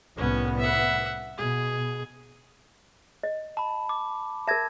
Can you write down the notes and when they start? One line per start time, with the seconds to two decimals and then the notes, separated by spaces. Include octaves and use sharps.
0.17 C2 A2 B3 C#4
0.59 E5 F#5
1.38 B2 G#4
3.23 D#5
3.57 A5 B5
3.89 D6
4.47 A#4 E5 A5 G#6